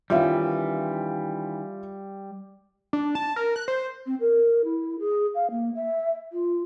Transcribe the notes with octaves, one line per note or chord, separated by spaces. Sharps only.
D#3 E3 G3 C#4 F4 E5 F5
D4
A5
A#4
F#6
C5
C4
A#4
E4
G#4
F5
A#3
E5
F4